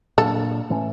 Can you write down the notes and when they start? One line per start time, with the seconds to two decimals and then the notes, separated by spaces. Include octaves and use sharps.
0.18 A#2 F#3 A#3 D4 A4
0.70 A2 E3 A3 C#4